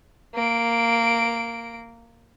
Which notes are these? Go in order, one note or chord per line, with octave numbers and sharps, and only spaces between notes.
A#3 D7